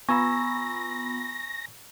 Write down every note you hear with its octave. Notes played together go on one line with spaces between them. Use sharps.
B3 F4 G#5 A#5 B5 C#6 E6 A#6